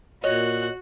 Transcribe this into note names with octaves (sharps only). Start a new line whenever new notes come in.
A#2 F#4 C#5 D#5 F#6